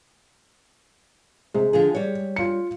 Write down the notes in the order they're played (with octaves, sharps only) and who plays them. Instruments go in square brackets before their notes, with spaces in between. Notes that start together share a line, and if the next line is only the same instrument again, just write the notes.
[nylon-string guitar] C3 [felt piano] G#3
[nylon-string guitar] D3 F3 G#4
G3 C#5
[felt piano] F4 C#7